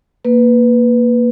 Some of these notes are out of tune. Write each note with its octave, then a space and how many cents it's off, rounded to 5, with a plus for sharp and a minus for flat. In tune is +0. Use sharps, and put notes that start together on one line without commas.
A#3 +0 B4 +0